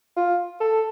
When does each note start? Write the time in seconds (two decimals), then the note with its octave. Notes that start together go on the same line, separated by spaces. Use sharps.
0.16 F4
0.60 A4